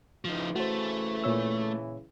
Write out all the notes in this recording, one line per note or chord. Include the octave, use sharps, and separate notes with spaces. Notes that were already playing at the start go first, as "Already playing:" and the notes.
C#3 E3 F3 D#4
A3 F#4 C5
A#2 C#5 E6